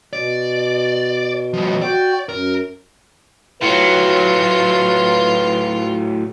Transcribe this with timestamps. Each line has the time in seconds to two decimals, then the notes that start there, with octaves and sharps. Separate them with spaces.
0.13 B2 D5
1.54 F3 G3
1.82 F#4 D5 G5
2.29 F#2 A#4
3.61 A2 F#3 F4 B4